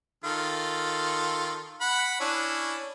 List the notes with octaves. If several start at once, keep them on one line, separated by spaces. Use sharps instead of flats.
D#3 F4 A4
F#5 B5
C#4 D4 E4